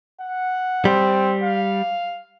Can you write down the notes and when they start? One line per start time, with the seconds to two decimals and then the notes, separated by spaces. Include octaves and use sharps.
0.21 F#5
0.85 G3 C4
1.43 F5